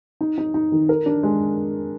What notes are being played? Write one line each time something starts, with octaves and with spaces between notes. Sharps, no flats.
D#4
D#4
D#4
D#3
A#4
D4
G#3